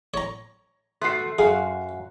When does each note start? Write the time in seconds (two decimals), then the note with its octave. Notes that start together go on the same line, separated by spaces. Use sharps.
0.14 C#5 A#5
1.02 A3 B3 F#4 C6 F#6 C7
1.39 F#2 F#4 G#4 F5